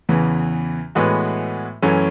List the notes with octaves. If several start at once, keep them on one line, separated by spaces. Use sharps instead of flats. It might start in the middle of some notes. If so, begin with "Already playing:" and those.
E2 C#3 E3
A2 E3 G#3 B3 F#4
F#2 E3 A3 C#4